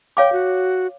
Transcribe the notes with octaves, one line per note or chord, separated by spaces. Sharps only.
C#5 F5 G5 D6
F#4